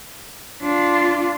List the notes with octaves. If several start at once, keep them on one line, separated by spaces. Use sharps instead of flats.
D4 F4